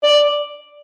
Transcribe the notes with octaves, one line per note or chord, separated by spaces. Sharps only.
D5